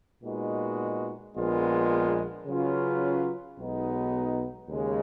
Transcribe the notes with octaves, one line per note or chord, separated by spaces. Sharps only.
A#2 G#3 B3 D#4 F#4
A#1 A#2 G#3 B3 F4
C#3 F#3 C#4 F4 B4
B1 B2 G#3 B3 D#4
D#2 C#3 G#3